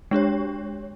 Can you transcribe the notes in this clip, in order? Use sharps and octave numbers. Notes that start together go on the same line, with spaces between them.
G#3 D4 G4 C#5